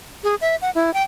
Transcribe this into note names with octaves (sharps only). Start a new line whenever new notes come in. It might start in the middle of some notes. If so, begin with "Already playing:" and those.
G#4
E5
F#5
E4
G5